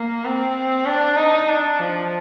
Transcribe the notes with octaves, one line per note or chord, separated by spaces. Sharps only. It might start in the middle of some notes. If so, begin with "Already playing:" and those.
Already playing: A#3
C4
D4
D#4
D4
F3